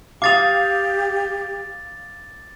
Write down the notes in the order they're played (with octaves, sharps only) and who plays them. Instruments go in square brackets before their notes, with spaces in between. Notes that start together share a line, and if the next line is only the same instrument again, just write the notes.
[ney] G4 [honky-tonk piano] F5 D#6 [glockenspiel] D6 A6 F7